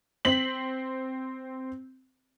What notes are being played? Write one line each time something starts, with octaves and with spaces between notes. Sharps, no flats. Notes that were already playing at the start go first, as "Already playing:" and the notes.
C4 B6 F#7